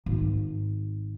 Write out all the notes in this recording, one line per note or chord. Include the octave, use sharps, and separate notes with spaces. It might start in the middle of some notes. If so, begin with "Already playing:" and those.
G#1